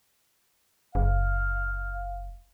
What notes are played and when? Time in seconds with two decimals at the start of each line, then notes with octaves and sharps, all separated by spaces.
0.95 F#1 F5